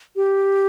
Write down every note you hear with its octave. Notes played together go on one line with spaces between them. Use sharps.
G4